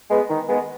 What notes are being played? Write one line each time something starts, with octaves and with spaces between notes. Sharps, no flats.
G#3 B3
D#3
G#3 B3